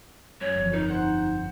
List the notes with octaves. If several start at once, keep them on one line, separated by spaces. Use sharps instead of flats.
F#2 C#5
G1 F2
D#3 D#4
C5 F#5